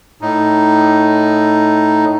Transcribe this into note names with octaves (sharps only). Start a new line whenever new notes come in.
A2 D#4